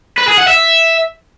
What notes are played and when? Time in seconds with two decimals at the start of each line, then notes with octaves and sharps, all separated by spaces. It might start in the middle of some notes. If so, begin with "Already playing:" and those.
0.18 B4
0.28 G#4
0.38 F#5
0.47 E5